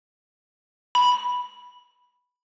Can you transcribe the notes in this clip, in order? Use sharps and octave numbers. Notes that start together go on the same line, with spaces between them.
B5